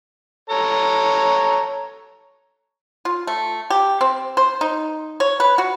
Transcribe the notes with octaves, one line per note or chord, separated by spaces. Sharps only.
A4 C#5 A#5
F4
A3
G4
C4
C5
D#4
C#5
B4
F#4